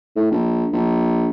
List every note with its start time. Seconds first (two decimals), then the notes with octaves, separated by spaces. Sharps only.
0.16 A2
0.31 A#1
0.73 A#1